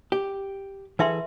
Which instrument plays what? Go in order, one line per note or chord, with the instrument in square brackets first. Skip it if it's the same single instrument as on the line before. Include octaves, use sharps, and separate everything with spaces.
[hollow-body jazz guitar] G4
[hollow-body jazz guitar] E3 G#4 A4 [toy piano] B4 E5 C6